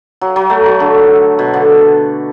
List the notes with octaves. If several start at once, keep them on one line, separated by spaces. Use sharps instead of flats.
F#3
F#3
A3
F#3
D3
B2
D3